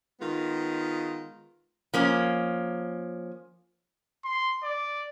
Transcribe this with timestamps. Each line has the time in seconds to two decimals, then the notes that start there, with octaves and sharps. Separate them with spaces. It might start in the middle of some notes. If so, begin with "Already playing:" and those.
0.20 D#3 G#3 B3 F4
1.94 F3 A#3 C#4
4.25 C6
4.63 D5